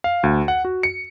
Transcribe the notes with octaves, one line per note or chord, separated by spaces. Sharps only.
F5
D2
F#5
F#4
C#7